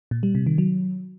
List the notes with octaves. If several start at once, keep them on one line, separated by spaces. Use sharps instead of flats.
A#2
G3
C3
D#3
F#3